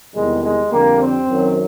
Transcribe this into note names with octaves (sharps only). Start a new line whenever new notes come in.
E2 C3 D#3 G3 G#3
G#3
F2 D3 G3 A#3
C4
F#2 D#3 F#3